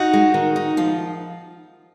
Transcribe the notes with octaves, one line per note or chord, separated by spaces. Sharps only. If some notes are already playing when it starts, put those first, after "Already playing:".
Already playing: D#4 F#4
G#3
D#3
D#4
F3 F4